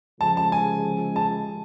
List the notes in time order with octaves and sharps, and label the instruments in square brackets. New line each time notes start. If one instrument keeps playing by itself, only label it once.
[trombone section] C#3 F3 G#3 [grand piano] A5
[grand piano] A5
G#5
A5